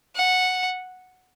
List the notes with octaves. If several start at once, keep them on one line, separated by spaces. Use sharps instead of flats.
F#5